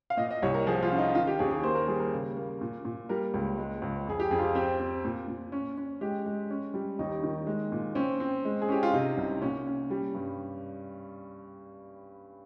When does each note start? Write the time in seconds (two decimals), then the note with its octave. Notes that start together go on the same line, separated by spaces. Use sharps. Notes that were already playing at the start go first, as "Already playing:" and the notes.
0.10 F5
0.17 A#2 D#5
0.31 D#5
0.42 C2 C#5
0.54 A#4
0.67 F3 G#4
0.83 F4
0.91 C#4
0.98 D#4
1.15 D#3 F4
1.27 G4
1.39 D#2 G#4
1.51 G#4
1.63 A#3 C5
1.75 A#4
1.87 G3 G#4
2.00 A#4
2.12 C#3
2.37 A#3
2.61 A#2
2.85 A#2
3.09 G3 A#4
3.34 C#2
3.58 G#3
3.82 C#2
4.07 F2 G#4
4.20 G4
4.31 F2 G#4
4.39 F4
4.43 G4
4.55 C4 G4
4.80 C4
5.05 A#2
5.28 A#2
5.52 C#4
5.78 C#4
6.01 G#3 G4
6.26 G#3
6.50 C#4
6.74 G3
6.99 D#2 D#4
7.23 D#3
7.47 G#3
7.72 A#2
7.95 C4 C#4
8.20 C4
8.45 G#3
8.62 G#4
8.68 C#4 G4
8.83 F4
8.93 C3 D#4
9.17 C2
9.41 A#2 C#4
9.67 C#4
9.90 G3
10.15 G2